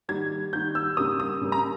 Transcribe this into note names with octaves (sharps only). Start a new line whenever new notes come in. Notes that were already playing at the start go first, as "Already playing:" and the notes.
D#3 G3 A#3 G#6
D#3 G3 A#3 G6
E6
C#3 G3 A#3 D#6
D#6
C#3 G3 A#3
A#5